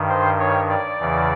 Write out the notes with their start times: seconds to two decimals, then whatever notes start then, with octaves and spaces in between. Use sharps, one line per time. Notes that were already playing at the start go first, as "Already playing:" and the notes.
Already playing: G2 D#3
0.09 C5
0.39 C#5
0.69 D5
0.99 E2 C#3 E3